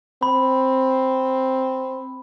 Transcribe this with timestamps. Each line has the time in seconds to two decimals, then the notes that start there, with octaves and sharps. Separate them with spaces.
0.23 C4 B5